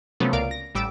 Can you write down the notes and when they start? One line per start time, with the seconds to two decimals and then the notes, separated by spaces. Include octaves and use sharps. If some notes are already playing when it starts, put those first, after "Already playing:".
0.20 C3 F3 F#3 A3 B3 C#4
0.33 C#2 A#4 D5 F5 D7
0.51 A#6
0.75 A1 G3 D6 E6 D7